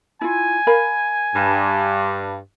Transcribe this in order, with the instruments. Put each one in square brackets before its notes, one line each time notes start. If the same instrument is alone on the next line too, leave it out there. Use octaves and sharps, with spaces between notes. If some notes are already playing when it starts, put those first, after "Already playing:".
[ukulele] E4 F4 [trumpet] G#5
[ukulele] A#4 F5 B5
[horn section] G2